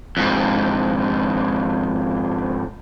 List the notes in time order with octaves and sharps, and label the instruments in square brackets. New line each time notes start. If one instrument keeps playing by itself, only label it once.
[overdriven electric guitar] F2 G#2